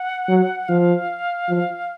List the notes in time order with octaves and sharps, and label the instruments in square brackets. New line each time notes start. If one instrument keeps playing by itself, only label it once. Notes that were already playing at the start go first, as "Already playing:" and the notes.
Already playing: [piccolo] F#5
[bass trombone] F#3
[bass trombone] F3 [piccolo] F5
[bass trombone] F3